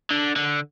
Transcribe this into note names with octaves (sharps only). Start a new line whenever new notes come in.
D3
D3